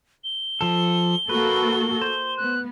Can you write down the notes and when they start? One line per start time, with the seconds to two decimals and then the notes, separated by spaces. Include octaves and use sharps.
0.24 G7
0.61 F3 A4
1.29 A#3 F#4 A4 B4
2.01 C5
2.37 B3 F#6